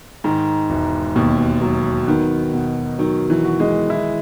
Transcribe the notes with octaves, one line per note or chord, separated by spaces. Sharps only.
G#2 D#3
E1
D#2 B2
F#3
D#3 B3
B2
D#3 F#3
E3
F#4
G#3
E4